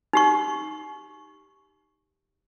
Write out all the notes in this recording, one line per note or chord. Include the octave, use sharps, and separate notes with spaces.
D#4 G4 C#6